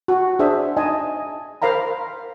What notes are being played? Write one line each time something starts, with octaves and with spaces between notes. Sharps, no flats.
F#4
D4 G#4 C5 E5
D#4 D#5 G#5 A5
A#4 C5 F5 A#5 B5